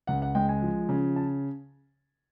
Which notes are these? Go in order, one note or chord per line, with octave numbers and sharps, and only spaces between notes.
C#2 F#5
F#5
G#3 G5
G#5
F3
C#3
A5